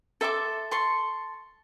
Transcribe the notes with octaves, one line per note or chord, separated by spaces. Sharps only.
A4 E5 C6 D6
A4 C6 C#6